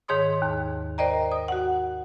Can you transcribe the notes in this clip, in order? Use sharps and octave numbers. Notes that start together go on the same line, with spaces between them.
G#2 D#3 G#4 C#5 C6 D#6
D#2
A#4 C5 D5 D#5 G5 A#5
D#6
F#4 F#5